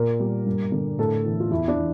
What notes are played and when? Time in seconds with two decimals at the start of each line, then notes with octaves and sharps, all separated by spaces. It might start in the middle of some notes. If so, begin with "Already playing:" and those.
Already playing: A#2 A#4
0.20 G3
0.46 G2
0.72 D3
0.99 A2 A4
1.25 E3
1.40 F4
1.50 E2 E4
1.68 D4
1.76 E3